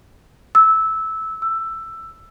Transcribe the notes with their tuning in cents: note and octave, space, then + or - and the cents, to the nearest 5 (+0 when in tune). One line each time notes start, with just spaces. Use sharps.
E6 -15
E6 +10